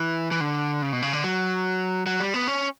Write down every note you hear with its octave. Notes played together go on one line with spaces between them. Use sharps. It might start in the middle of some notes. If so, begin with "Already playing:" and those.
Already playing: E3
E3
D3
C#3
B2
C#3
D3
F#3
F#3
G3
B3
C#4